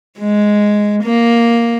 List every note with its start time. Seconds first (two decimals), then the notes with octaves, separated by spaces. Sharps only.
0.18 G#3
1.03 A#3